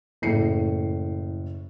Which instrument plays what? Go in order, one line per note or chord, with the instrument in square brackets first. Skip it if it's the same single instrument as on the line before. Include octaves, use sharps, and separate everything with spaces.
[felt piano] F#1 A2 C7 C#7